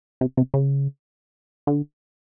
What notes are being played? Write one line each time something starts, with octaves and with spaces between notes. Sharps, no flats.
C3
C3
C#3
D3